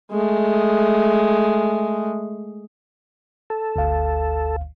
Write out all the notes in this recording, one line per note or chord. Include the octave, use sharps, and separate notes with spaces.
G#3 A3
A4
G1 D2 F5